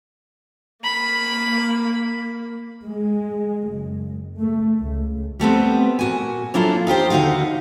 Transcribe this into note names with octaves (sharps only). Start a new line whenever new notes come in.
A#3 B5
G#3
F#1
A3
C#2
G3 A3 B3 C4
A#2 F#4 G#5
F#3 A#3 D4 E4 F4 A4
D#4 F4 G4 C5
D#2 D3 D4 D#4 F#4 F5